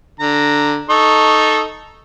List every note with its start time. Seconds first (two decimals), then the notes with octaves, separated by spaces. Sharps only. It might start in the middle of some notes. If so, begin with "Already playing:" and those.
0.20 D3 A#5
0.90 D#4 A4 C#6